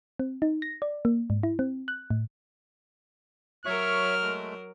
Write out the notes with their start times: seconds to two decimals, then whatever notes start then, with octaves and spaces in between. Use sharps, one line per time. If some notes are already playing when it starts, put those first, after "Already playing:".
0.19 C4
0.42 D#4
0.62 A#6
0.82 D5
1.05 A#3
1.30 G#2
1.43 E4
1.59 C4
1.88 F#6
2.10 A2
3.66 F#3 A#4 C#5 E5 C#6 F6
4.22 G#3 A3